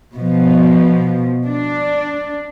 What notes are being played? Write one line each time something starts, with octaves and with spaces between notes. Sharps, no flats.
B2 F3
D4